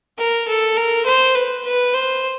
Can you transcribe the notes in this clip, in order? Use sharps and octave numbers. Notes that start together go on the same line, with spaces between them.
A#4
A4
A#4
C5
B4
B4
C5